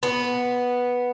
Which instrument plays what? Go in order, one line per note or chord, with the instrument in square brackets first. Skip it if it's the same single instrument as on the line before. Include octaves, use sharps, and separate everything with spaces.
[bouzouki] B3